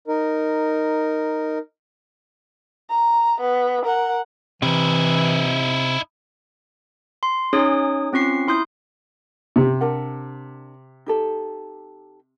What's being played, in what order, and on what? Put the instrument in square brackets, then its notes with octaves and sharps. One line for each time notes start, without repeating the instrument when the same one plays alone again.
[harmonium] D#4 A#4
[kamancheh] A#5
B3
A#4 F#5
[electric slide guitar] C3 [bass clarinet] E3 [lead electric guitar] D#4 E4
[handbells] C6
C#4 D#4 G#4 C#5 D#6
C4 C#4 F4 C#6 C7
E4 C6 D#6 G6
[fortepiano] C3
[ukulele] D4 A#4 F#5
D#4 G4 A4